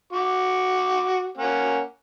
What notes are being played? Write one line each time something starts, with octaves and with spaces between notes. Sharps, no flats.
F#4 D6
A#3 C#4 F#5